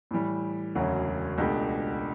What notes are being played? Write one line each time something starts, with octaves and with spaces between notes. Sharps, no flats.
A2 E3 G3
E1 D2 C#3 F#3
C#2 B2 A3 D4 G4